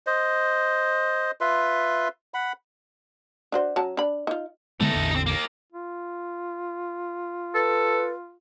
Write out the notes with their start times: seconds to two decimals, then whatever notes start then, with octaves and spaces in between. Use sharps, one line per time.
0.07 C5 D#5
1.41 F4 B4 E5 C6
2.34 F#5 B5
3.52 D4 F#4 C5
3.76 F#3 C#4 A5
3.97 D4 B5
4.27 D#4 F4
4.81 D3 G#3 A3 B3 D#4
4.94 A1 E2 D3
5.11 C4 D#4
5.26 D#3 A#3
5.72 F4
7.54 A4 B4